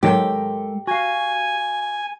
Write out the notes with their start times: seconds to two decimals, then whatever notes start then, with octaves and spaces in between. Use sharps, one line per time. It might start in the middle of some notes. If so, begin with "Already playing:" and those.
0.03 G#2 D#3 F#3 G#3 G4 A4 A#4
0.87 F#4 F5 G#5